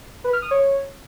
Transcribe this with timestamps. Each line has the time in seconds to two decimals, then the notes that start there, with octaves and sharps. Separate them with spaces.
0.24 B4
0.33 F6
0.42 D#6
0.51 C#5